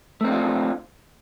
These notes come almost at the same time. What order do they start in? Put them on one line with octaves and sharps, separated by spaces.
A3 C4 D4 F4